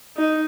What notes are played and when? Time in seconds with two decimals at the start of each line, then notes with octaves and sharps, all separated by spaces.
0.17 D#4